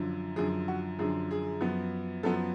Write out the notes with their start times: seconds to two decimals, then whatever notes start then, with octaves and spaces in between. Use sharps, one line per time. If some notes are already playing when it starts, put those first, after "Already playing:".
Already playing: F#2 D3 F3
0.36 F#2 D3 F3 G#4
0.68 F#4
0.98 F#2 D3 F3 G#4
1.31 G#4
1.61 F#2 F3 B3
2.23 F#2 F3 B3 A4